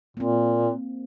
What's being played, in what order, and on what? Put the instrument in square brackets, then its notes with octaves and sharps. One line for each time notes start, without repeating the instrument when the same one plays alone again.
[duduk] A#2 [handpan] A#3 C4